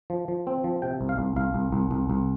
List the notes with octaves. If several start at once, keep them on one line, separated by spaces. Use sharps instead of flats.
F3
F3
C4
F3
C3 G5
C2
F5
C2
C2 F5
C2
C2
C2
C2